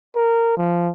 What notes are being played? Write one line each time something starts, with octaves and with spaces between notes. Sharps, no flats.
A#4
F3